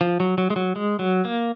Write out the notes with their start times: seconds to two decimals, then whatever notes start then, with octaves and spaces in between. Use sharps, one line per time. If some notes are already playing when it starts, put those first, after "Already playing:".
0.01 F3
0.20 F#3
0.38 F#3
0.50 G#3
0.56 F#3
0.76 G#3
0.99 F#3
1.25 A#3